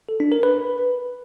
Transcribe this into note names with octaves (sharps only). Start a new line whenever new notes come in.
A4
D4
A#4
B4